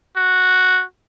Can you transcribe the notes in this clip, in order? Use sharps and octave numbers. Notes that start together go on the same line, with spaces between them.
F#4